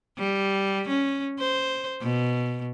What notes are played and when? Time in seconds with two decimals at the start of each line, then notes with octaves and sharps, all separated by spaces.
0.18 G3
0.88 C#4
1.39 C5
2.01 B2